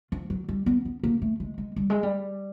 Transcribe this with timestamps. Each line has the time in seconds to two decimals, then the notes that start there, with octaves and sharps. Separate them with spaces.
0.12 F3
0.30 F#3
0.49 G3
0.66 B3
0.85 B3
1.03 A#3
1.22 A3
1.40 G#3
1.58 G#3
1.76 G3
1.90 G#3
2.03 G3